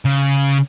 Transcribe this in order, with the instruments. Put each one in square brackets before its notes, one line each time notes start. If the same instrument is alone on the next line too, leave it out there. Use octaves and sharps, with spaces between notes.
[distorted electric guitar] C#3